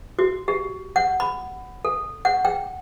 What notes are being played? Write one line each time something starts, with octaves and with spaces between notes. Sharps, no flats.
F#4
G4
F#5
B5
A4
F#5
G5